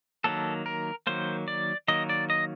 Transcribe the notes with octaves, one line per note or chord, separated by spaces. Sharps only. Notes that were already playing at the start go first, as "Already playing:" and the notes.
D#3 F#3 A#3 A4
A#4
D#3 F#3 A#3 C5
D5
D#3 F#3 A#3 D#5
D5
D#5